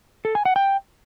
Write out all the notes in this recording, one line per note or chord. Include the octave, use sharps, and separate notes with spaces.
A4
G#5
F#5
G5